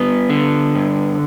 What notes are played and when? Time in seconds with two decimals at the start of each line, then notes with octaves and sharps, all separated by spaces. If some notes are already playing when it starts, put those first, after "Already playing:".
Already playing: G2 B3
0.29 D3
0.75 G2